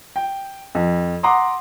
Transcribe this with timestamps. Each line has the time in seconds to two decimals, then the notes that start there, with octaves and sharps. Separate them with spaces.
0.16 G5
0.75 F2
1.23 F#5 A#5 C6 D6 D#6